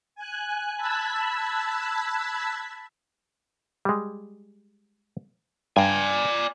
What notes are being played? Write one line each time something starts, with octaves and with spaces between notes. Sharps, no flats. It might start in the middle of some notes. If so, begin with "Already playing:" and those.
G#5 F#6
A5 B5 E6 F#6 G#6 B6
G3 G#3
G2 D5 G#5